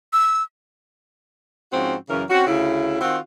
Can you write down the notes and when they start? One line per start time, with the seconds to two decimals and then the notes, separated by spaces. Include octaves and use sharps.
0.13 E6
1.72 G#2 F3 C4 C#4 F#4
2.10 F#2 C#3 E3 C#4 A#4
2.30 C4 C#4 F#4
2.47 D2 C#3 E4
3.01 D#3 C4 F4 F#4